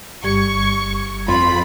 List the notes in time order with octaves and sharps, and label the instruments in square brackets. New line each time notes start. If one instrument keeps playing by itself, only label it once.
[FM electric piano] G1 G3 G#6 [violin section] C#6
[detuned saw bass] F2 [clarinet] F4 [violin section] B5